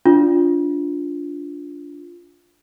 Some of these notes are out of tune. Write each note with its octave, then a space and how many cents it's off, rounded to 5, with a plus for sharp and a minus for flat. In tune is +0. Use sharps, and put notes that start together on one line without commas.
D4 -20 F4 +0